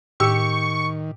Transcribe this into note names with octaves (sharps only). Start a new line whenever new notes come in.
A2 D#3 G4 C#6 E6